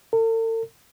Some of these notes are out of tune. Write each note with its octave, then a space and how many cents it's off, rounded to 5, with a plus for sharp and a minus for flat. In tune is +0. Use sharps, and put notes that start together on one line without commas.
A4 +45